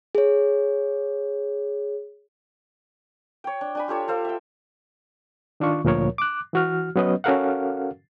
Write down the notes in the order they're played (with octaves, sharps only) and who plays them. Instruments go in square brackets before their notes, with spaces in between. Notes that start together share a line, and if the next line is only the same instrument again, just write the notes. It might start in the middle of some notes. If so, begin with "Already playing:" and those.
[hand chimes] G#4 C#5
[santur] C#5 G5
D4
D4 G#5 B5
F4 G4 A4 C#5
A4 C5 F5
E5 G5
[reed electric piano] D#3 D4 F4 C#6
D2 A#2 F3 A#4 C#5
D6 F#6
E3 F#4 F6
F#3 B3 C#4 B4 D#5
C#4 F#4 A4 A#4 F5 F#5